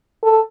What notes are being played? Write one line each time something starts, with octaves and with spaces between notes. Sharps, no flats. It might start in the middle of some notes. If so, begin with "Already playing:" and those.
A4